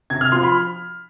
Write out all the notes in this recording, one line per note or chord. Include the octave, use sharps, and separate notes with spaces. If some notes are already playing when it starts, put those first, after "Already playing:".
C3 G#6
F6
F3 C6
B5